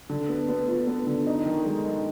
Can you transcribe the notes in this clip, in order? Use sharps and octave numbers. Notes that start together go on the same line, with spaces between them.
D3
B3
B3
F4
B3
D3
D#4
D#3
G#3
D#3